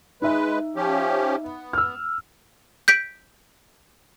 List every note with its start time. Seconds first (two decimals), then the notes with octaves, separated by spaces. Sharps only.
0.22 G#3 D#4 B4 E5
0.76 F3 C#4 G4
1.44 B3
1.73 E6 F6
2.88 G6 B6 D7